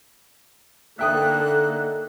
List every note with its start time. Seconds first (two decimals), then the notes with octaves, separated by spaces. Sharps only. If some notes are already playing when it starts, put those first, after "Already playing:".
0.99 D3 A#3 D#4 A4 E5 G5 D#6 F#6